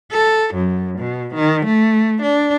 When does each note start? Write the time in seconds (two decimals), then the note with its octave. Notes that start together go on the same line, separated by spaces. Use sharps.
0.12 A4
0.54 F#2
0.99 B2
1.35 D#3
1.65 A3
2.22 D4